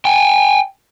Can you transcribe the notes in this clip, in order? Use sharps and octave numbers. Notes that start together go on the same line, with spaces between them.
G5 G#5